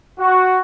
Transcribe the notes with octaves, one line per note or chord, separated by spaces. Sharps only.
F#4